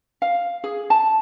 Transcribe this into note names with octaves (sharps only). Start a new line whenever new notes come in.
F5
G#4
A5